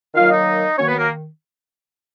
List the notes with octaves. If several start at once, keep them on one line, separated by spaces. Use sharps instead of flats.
D#3 F#3 A#3 F4 F5
D#4 D#5
D#3 F#3 A#3 C#4 C#5
B3 B4
A#3 A#4